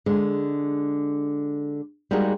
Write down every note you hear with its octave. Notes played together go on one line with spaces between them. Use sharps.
D3 G#3
G3 G#3 A#3 D#4 F#4 G#4